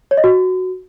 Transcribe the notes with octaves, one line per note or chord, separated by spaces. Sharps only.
C#5
D#5
F#4